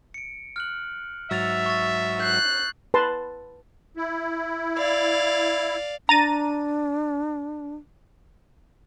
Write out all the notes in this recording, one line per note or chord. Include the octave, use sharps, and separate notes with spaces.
C#7 D7
F6 F#6 F#7
G#2 F#3 F#4 E5 E6 A6 F7
C#6 A6
F#6 G6 C7
B4 A5 C6
E4
D5 F5
D4 A#5 A6 D#7